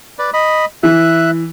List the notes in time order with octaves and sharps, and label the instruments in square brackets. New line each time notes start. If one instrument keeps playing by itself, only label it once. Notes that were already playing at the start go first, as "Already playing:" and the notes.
[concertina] B4 D5
D#5 B5
[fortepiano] E3 [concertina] E5 F#6